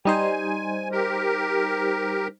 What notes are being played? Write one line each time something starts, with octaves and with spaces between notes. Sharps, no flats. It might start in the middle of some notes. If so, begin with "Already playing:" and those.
G3 D#4 C5 G#5
G4 A#4